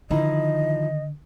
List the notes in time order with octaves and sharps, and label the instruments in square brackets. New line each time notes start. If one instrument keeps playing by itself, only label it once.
[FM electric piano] D3 [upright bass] D#3 [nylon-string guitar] F3 D#4 E4 [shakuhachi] D#5